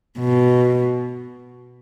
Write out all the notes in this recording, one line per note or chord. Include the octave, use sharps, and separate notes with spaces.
B2